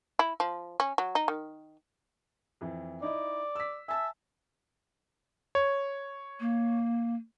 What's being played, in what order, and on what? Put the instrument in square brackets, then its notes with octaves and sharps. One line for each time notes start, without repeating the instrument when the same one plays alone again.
[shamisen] E4
F3
C#4
F#3
D#4
D#3
[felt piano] F2 E3
[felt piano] D#4 E4 D#5 [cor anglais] D5
[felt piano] E6 B6
[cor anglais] E5 [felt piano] G#5 A5 E6
[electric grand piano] C#5
[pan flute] A#3